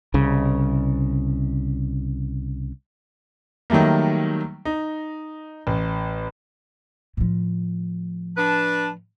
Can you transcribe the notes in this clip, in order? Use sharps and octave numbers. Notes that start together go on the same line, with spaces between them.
C2 C#3
D#3 F#3 G3 A3 A#3
D#4
A1
A2 F3
D4 B4 A5